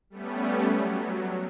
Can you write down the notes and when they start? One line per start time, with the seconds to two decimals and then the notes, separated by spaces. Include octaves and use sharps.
0.10 G3 A3 B3 C#4
0.73 F#3